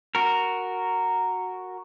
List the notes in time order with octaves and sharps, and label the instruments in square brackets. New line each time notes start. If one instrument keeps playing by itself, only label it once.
[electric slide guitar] F#4 A#4